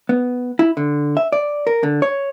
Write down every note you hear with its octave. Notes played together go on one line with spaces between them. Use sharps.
B3
E4
D3
E5
D5
A#4
D3
C#5